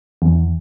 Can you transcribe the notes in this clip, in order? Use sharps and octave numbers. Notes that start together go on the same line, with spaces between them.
E2